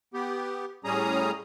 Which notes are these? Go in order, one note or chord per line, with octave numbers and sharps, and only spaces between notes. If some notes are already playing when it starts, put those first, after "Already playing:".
B3 G4
A2 G3 C#4 G#4 A#5 D#6